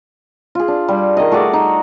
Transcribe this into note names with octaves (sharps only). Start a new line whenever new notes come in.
F4 G#4
D4
G3
D#3 D#5
A3 F#4 G#4 D5
D#4